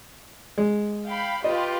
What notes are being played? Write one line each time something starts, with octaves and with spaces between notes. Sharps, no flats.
G#3
F5 G5 B5
F4 G4 B4 D#5